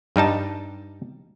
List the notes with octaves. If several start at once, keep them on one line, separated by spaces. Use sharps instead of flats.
G2 G3 D#4 A5